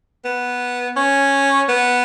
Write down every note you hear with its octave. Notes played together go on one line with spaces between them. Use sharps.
B3
C#4
B3